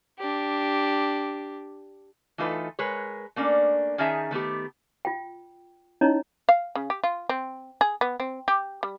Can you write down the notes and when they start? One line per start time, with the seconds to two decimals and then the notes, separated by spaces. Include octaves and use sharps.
0.19 D4 G4
2.38 E3 A3 D#4 F4 A4 B4
2.79 G#3 A#4 B4 C#5
3.36 A3 A#3 C#4 D4
3.98 D#3 C#4 D#4 G#4 E5 A5
4.31 D#3 A3 B3 G4
5.05 F4 G5
6.01 C#4 D#4 E4 C#5 D#5 A#5
6.49 F5
6.75 C#3
6.90 G4
7.04 F4
7.29 C4
7.81 G#4
8.01 B3
8.20 C4
8.48 G4
8.83 G3